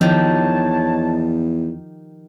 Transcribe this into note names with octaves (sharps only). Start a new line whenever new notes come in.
E2 D#3 F3 D#4 G4 C#5 A5